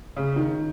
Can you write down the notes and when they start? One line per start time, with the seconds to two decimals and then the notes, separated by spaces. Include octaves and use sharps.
0.16 C#3
0.36 D#3